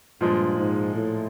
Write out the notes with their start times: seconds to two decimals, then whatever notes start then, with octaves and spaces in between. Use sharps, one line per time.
0.20 G2 A#2 F3 G#3
0.56 G#2
0.93 A2